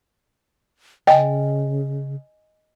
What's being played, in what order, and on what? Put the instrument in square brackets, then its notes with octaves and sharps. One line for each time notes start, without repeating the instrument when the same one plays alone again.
[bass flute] C#3 [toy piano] D#5 G#5 [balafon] G5